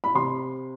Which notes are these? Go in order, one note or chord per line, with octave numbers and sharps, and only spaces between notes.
B5
C3 C6